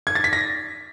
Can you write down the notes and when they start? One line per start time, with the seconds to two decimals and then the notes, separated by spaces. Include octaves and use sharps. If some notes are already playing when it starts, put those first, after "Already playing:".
0.07 G#6
0.15 A6
0.24 B6
0.33 A#6